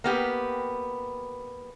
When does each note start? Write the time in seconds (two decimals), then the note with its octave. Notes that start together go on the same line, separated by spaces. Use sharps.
0.04 A#3 B3 G4